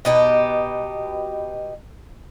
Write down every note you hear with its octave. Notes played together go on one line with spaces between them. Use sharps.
B2 D#4 G4